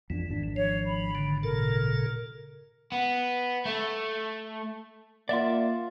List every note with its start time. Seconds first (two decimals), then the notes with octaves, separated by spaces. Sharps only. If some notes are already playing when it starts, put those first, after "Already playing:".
0.10 F2 E3 B3 D4
0.29 G#1 D4
0.56 F3 C#5
0.86 B5
1.15 D3
1.43 A#2 C#3 A4 A#4
2.92 B3
3.65 A3
5.29 A#3 F4 D5 E5 F#5